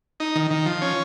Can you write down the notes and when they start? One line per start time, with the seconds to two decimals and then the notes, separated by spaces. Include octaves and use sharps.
0.20 D#4
0.35 D#3
0.51 D#3
0.66 F3
0.82 C#4